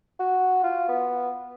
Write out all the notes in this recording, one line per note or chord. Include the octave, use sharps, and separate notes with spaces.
F#4
F4
B3